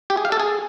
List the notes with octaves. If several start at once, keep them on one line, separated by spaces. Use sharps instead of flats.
G4
G#4
F5
A4
G#4